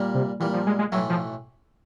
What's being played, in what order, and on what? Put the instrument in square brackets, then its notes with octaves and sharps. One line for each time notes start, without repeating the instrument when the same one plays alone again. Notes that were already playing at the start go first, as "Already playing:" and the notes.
Already playing: [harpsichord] A#2 G3 A#3
[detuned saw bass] C3
[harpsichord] A#2 G3 A#3 [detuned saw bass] E3
[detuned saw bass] F3
G#3
G#3
[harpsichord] B1 A2 E3 A3 [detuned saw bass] F#3
[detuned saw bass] F3